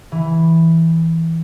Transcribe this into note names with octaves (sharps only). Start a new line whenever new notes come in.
E3